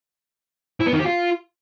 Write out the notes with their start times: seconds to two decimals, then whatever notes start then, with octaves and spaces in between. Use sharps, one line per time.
0.80 E4
0.86 B3
0.93 D#3
0.99 G4
1.05 F4